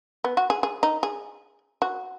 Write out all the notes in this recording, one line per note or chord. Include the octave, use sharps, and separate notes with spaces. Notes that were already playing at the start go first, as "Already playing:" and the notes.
B3
F#4
G#4
G#4
D#4
G#4
F#4